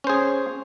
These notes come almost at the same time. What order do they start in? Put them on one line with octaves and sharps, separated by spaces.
C#4 C5 G#4